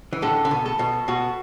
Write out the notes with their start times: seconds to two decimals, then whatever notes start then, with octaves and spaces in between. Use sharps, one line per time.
0.13 E3
0.22 A2 D3 A4
0.45 D3
0.51 B2
0.66 A4
0.79 B2
1.08 B2 F#4